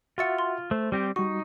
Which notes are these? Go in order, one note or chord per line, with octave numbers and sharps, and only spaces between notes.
F4 F#4 E5 F#5 C#6 A6 C#7
C6
A3 C5
G3 C4 G4
G3 D#4 F#4 C#6